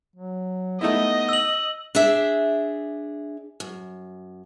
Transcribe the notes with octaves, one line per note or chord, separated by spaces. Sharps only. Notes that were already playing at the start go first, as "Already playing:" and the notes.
F#3
A3 B3 D#4 E4 D#5
E6 F#7
D4 G#4 E5
F#2